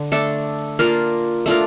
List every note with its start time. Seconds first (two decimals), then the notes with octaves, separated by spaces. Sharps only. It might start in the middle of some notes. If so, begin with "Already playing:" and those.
Already playing: D3
0.12 A3 D4 A4
0.79 A#3 D4 F4 A#4
1.46 A3 D4 F4 A#4